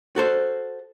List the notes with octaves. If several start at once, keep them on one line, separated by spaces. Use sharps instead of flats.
F#4 A4 C5